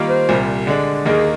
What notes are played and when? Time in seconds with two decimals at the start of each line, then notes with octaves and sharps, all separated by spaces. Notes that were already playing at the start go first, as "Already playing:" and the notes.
Already playing: D#3 G3 A#3 F4
0.09 C5
0.29 C2 A#2 G3
0.67 D3 G#3 D4
1.06 D#2 D#3 A#3 D#4 G#4